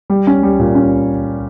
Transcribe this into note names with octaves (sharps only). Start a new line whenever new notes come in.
G3
C#4
G3
A#2
C#4